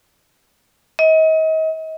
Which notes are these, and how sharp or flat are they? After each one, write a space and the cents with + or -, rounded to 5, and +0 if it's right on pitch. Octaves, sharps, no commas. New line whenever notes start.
D#5 +35